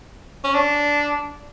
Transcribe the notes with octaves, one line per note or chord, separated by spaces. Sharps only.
C#4
D4